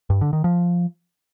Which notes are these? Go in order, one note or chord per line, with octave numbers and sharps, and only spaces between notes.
G2
D3
D#3
F3